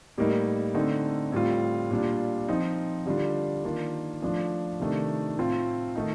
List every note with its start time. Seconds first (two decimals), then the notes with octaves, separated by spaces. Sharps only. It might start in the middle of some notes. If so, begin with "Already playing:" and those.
0.18 A2 G3 A#3 D#4
0.75 D3 A3 C4 D#4
1.32 A2 G3 C4 F4
1.91 A#2 G3 D4 F4
2.48 F3 C4 D#4
3.06 D3 G3 D4 F4
3.64 D#3 A#3 D4 F4
4.22 F3 A3 D4 F4
4.80 C3 D#3 A3 D4
5.37 A2 A3 C4 F4
5.95 D#3 A3 D#4